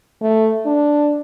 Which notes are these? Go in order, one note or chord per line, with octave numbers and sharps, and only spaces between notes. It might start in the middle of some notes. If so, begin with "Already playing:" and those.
A3
D4